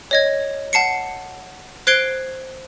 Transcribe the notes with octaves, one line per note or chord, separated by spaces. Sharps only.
C#5 D#5 G#6
F#5 A5 C7 C#7
C5 F#6 G#6 C7 D7 G7